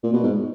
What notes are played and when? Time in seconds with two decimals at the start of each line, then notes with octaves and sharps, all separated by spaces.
0.03 A#2
0.13 B2
0.23 G#2